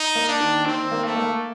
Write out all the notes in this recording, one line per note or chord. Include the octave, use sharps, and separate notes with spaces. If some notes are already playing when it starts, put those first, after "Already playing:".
Already playing: D#4
A#3
D4
D#3
D#3 C4
A#3
A3
A#3